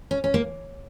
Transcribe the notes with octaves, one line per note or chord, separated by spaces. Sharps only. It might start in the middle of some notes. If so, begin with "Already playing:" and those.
C#4
C#4
A#3